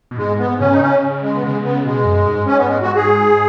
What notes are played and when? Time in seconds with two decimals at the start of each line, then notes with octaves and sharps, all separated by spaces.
0.11 B2
0.18 G#2 G#3
0.39 B3
0.60 C#3 C#4
0.72 D#4
0.81 C#4
1.22 G#3
1.35 B3
1.43 C#3 G#3
1.64 B3
1.84 B2 G#3
2.05 F#2
2.27 G#2
2.47 C#4
2.58 B3
2.68 G#3
2.82 F#4
2.96 G#4